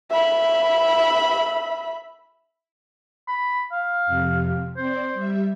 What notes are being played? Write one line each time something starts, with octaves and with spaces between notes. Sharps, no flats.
E5 B5
B5
F5
F2 C3
C4 C5 D5
G3 E5